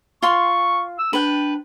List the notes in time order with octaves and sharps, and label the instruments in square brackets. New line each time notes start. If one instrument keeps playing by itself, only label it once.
[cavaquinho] F4 C6 [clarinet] C#6
[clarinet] E6
[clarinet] D4 [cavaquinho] B4 G5